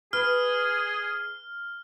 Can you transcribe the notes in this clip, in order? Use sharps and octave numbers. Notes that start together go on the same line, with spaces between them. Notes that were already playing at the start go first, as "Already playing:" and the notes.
G#4 B4 F6